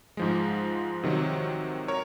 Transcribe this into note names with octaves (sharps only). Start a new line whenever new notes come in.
G#2 F3 G#3
C3 D#3 F#3
A#4 C#5